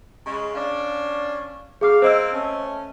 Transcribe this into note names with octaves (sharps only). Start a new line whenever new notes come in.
C#3 G#3
C#4 D4 F5
F#2 G#4 F5 D6
A#3 C4 C5 D#5 E6
A3 C#4